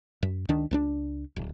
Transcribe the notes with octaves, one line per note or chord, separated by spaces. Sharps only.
F#2
C#2 D#3 D4
C#2 A3 D4
D1